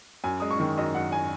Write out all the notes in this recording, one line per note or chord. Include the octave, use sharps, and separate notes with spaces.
F#2 G#5
G#3 D#6
C#6
D#3
F#2 D#5
F#2 F#5
G#5